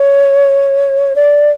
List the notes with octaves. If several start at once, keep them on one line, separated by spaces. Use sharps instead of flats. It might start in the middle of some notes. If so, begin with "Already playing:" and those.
Already playing: C#5
D5